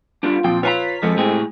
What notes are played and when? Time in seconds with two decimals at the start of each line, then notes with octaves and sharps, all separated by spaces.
0.23 G3 B3 D4 F4
0.44 A#2 F3 C4 G5
0.63 F4 B4 C#5 F5 G#5 A#5 B6
1.02 F2 F3 G#3 B3 A4 C5
1.17 A2 C4 G4 G#4